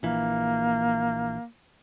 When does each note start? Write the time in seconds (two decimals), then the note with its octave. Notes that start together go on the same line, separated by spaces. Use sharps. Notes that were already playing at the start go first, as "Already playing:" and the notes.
0.03 A#1 E3 A#3